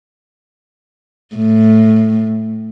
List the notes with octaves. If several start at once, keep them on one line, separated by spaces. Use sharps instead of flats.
A2